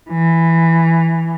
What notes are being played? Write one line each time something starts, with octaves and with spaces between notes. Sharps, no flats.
E3